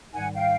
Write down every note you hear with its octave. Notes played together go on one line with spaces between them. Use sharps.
G#2 D#3 G3 F#5 G#5
F5 G5